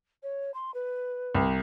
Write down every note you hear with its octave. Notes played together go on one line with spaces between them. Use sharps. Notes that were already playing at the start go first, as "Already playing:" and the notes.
C#5
C6
B4
C2